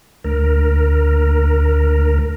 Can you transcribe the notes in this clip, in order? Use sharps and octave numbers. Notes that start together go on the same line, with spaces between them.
D2 A#4